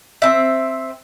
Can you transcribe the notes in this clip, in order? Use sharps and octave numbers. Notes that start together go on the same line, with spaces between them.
C4 E5